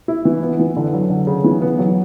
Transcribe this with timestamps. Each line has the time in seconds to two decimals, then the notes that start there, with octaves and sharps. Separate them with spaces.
0.08 E4
0.25 E3
0.43 B3
0.59 E3
0.77 D3
0.93 F#3
1.10 D3
1.27 C#3
1.44 E3
1.62 B3
1.79 F#3